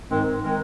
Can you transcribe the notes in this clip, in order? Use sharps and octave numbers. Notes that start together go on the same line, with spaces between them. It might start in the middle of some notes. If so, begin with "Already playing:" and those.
G#2 D#3 G#3 C4
D#3 G#3 C4 A#4